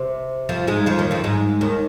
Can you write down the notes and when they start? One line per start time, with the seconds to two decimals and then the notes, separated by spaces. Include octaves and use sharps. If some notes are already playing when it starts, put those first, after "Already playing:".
Already playing: C3
0.49 F2 F3
0.67 G#2 G#3
0.86 F2 F3
0.98 D#2 D#3
1.11 F2 F3
1.24 G#2 G#3
1.61 D#2 D#3